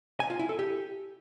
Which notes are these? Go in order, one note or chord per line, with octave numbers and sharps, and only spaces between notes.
G#5
F4
E4
A4
G4